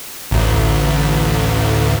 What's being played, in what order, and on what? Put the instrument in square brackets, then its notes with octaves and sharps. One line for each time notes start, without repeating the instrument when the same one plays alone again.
[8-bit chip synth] A1 D2